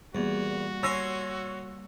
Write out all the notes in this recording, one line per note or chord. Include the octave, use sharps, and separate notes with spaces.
E2 G3 A#3 F#4
C#4 G#5 C6 C#6 E6 A#6